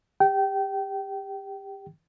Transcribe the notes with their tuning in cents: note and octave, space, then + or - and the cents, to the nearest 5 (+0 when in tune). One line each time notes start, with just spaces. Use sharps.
G4 +30 G5 -25